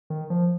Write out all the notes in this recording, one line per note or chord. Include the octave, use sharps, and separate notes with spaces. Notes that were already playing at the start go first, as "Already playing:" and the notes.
D#3
F3